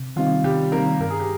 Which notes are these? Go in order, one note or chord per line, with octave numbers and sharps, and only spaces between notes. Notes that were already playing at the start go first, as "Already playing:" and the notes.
Already playing: C3
D#3 G3 C4 D#4 F4
C3 G3 G4
D#3 G3 A#3 C4 D#4 A#4
G2 A#4
G#4
G4